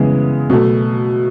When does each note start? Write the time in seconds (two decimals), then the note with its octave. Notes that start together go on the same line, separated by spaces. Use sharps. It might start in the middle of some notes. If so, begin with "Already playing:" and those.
Already playing: C#3 E3 G#3 B3 G#4
0.50 B2 F#3 A3